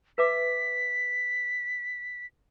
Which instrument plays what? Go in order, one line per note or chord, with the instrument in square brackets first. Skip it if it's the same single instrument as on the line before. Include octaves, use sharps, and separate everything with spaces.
[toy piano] B4 E5 D6 [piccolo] B6